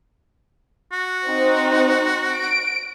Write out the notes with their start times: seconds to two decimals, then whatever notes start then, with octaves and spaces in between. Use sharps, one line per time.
0.92 F#4
1.27 C4 D#4
2.32 D7